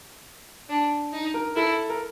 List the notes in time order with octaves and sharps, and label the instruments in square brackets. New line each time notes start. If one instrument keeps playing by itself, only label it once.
[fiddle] D4
D#4
[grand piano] A#4
[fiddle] E4 [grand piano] A4
[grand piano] A#4